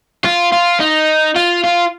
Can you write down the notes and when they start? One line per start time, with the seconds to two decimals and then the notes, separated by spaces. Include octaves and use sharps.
0.24 F4
0.52 F4
0.80 D#4
1.36 F4
1.64 F4